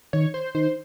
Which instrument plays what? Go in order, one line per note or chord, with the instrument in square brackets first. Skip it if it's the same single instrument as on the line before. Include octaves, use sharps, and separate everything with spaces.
[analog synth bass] D#3 [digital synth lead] C#5
[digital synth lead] C5
[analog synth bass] D#3 [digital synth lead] C5